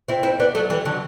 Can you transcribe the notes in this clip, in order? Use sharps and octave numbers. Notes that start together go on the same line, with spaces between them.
C4 E4
C4 E4
B3 D4
F#3 A3
E3 G3
D3 F#3